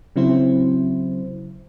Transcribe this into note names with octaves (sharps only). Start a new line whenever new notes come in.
C#3 F#3 C4 E4 C5